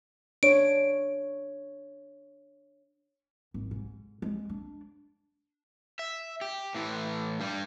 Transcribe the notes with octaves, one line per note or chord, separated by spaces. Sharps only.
D4 C#5 D7
G#1
G#2
G#3
D4
E5
G4
A2 E3
G2 G3